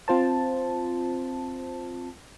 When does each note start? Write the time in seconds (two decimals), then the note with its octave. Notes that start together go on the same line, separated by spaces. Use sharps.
0.08 C4 F4 C5 A5